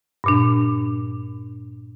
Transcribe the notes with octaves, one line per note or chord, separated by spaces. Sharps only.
G2 A#2 D4